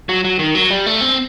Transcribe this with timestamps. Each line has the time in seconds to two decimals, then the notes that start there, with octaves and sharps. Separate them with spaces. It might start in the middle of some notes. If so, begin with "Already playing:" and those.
0.09 F#3
0.24 F#3
0.39 D#3
0.55 F#3
0.71 G3
0.86 A3
1.01 C4